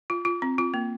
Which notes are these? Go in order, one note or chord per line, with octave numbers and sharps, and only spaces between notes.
F4
F4
C4
F4
A#3